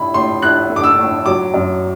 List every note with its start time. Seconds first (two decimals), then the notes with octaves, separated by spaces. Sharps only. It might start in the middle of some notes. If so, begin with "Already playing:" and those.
Already playing: A2 E4 B5
0.14 A2 C6
0.42 E4 F#6
0.69 A3
0.76 D6
0.84 E6
0.98 A2
1.26 F#3 D6
1.54 F#2